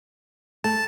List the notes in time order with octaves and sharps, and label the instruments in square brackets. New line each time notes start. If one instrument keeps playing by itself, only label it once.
[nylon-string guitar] A3 [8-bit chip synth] A5